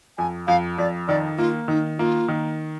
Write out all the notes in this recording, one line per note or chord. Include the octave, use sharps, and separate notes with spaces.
F2 G#5
F2 F5
F2 D5
D#3 D5
A#3 F4
D#3 D#4
A#3 F4
D#3